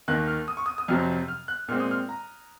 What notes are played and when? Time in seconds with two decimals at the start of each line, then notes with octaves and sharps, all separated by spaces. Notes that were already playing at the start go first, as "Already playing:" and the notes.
0.08 D#2 D#3 A#3 F#6
0.28 F6
0.48 D#6
0.57 C#6
0.66 D#6
0.78 D#6
0.88 F2 C3 F#3 C4 F6
1.28 F6
1.48 F#6
1.68 A#2 G#3 C4 F6
1.80 D#6
1.91 F6
2.09 A#5